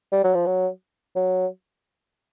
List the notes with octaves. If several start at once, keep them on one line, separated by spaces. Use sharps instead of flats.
G3
F#3
F3
F#3
F#3